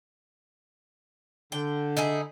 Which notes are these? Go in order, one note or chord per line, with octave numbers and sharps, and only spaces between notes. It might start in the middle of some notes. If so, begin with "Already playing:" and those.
D3 G5
D#4 E4 G#4